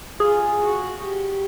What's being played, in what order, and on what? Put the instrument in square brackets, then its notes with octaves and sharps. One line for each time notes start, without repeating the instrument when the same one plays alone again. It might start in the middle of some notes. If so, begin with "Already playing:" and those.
[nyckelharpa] F4 [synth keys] G#4
[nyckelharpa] F#4
G4